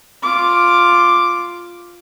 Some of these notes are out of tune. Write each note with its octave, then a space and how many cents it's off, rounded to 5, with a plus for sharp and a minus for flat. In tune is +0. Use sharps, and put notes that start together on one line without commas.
F4 +0 D6 +0